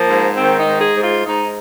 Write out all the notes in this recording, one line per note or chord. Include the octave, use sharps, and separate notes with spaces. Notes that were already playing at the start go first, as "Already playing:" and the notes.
Already playing: F3 A#3
G#2
D#3 C4
D#4
G#2
G#4
G#2
F4
G#2 D#4